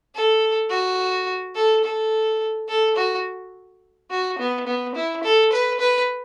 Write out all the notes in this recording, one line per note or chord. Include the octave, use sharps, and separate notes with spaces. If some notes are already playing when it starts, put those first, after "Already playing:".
A4
F#4
A4
A4
A4
F#4
F#4
B3
B3
E4
A4
B4
B4